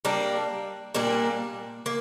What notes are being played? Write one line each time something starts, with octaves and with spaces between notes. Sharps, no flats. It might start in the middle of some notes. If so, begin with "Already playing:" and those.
G3 A#3 D4
A#2 G3 A#3 D4
A#3